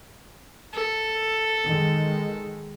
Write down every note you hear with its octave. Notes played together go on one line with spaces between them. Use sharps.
A4
D#3 G#3